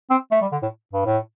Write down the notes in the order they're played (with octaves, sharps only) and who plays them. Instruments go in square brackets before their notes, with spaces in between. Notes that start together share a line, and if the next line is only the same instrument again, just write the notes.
[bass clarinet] C4
A3
G3
D3
A2
G2
A2